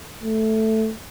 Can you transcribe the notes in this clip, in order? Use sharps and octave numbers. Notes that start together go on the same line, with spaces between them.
A3